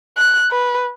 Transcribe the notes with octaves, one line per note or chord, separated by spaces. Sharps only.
F#6
B4